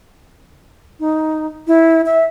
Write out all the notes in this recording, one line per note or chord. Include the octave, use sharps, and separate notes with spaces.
D#4
E4
E5